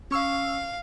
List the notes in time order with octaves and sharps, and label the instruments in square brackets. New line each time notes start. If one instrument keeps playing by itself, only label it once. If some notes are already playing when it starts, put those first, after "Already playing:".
[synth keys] C#4 C#6 E6 [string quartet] F5